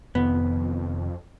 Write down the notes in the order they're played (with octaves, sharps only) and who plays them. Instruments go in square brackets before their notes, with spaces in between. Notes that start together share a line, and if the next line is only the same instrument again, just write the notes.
[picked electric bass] F1 C3 D#3 [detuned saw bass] F2 [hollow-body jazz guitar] B3